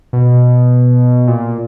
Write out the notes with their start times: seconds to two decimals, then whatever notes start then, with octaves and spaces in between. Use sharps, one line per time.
0.13 B2
1.28 A#2